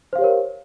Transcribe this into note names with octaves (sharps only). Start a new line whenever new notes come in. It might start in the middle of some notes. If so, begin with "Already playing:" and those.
G4 A#4 C5 C#5 F5